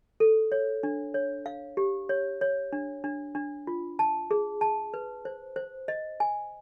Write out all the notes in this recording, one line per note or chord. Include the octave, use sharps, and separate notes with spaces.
A4
C#5
D4
C#5
F5
G4
C#5
C#5
D4
D4
D4
F4
A5
G#4
A5
B4
C5
C5
D#5
G#5